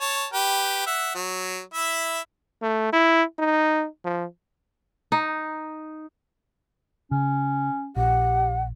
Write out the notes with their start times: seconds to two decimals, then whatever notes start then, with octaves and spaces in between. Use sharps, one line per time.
0.01 C#5 A5
0.33 G4 B4
0.86 E5 F#5
1.15 F#3
1.74 E4 E5
2.62 A3
2.93 E4
3.39 D#4
4.05 F3
5.12 D#4
7.11 C#3 C#4
7.96 A#1 G4 F#5